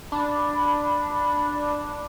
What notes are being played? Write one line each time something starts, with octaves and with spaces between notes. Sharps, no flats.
D4 B5